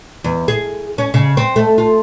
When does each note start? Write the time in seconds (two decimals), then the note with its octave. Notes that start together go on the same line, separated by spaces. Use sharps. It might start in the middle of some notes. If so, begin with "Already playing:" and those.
0.24 E2
0.48 G#4
0.98 C#4
1.14 C#3
1.37 C4
1.56 A3
1.78 F4